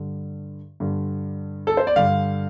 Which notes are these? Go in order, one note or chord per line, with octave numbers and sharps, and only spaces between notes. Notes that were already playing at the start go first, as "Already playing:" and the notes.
Already playing: G2 D3
G2 D3
A4
C5
D5
G2 D3 F5